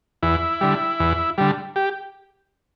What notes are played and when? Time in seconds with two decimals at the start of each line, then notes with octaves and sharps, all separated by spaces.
0.23 E2 E4
0.61 D3 G3
1.00 E2
1.38 D3 G3
1.76 G4